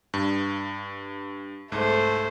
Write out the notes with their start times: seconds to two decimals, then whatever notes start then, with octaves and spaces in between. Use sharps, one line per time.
0.14 G2
1.72 C2 G#2 A3 C5